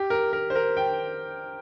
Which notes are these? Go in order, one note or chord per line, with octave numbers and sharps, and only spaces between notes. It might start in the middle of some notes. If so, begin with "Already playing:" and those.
Already playing: G4
A#4
A#4
C5
A#4
G5